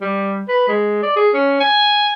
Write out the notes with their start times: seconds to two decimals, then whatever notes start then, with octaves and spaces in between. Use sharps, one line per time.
0.01 G3
0.48 B4
0.68 G#3
1.03 D5
1.16 G#4
1.34 C#4
1.60 G#5